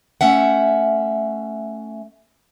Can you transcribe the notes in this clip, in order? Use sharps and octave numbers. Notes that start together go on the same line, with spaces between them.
A3 C#4 E5 F#5